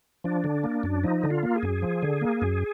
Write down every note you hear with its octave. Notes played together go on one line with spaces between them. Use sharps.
F3 D4
D3
A#3
F#2
F3 D#4
D3
F4
A#3
G#4
F#2
F3
D3
A#3
F#2